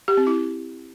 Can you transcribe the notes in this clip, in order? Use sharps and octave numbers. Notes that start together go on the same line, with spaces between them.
G4
C4
E4